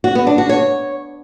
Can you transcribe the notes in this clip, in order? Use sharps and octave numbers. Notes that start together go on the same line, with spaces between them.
F#4
B3
D4
F#4
C#5